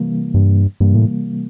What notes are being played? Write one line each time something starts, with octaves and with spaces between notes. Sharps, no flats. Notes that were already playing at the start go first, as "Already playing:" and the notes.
Already playing: C3 E3 G3 A#3
G2
G2 C3 E3 G3 A#3
A2